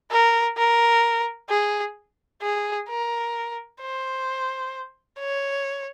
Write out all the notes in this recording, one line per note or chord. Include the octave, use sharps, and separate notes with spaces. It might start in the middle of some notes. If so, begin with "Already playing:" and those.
A#4
A#4
G#4
G#4
A#4
C5
C#5